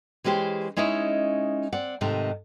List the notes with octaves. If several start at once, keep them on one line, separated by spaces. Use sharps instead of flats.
E3 G#3 C#4 G4 C5
G#3 C#4 D#4 E4 D#5
C4 D5 F#5
G#2 C3 D#3 A3